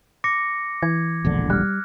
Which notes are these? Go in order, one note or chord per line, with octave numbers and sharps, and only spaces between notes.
D6 A#6 C#7
E3 G#6
E1 A#1 D3
G3 F6 F#6